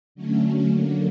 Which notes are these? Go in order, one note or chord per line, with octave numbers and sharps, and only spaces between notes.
D3 F#3 A3 C#4
D3 F#3 A#3